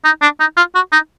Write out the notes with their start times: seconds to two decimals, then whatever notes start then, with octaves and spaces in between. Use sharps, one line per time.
0.05 D#4
0.22 D4
0.40 D#4
0.57 F4
0.75 F#4
0.92 D#4